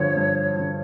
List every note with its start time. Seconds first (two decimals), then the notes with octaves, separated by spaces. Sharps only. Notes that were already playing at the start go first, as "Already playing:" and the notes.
Already playing: G2 D3 F3 C#5
0.17 G2
0.57 D3 F3